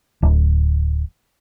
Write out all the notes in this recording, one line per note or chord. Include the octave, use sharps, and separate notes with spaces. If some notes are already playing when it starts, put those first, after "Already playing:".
D1